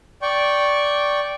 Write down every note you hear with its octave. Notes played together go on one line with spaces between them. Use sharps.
D5 G5 C#6